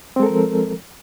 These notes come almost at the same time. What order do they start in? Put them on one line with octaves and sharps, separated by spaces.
C4 G#3 A4 A#4 F3